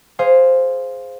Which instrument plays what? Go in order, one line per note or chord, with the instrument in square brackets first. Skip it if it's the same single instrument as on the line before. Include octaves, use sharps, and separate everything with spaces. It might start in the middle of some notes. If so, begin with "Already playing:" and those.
[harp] G#4 C5 F5